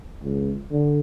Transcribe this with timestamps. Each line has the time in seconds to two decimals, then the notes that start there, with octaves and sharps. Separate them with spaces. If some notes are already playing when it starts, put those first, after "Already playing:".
0.22 C#2
0.70 D3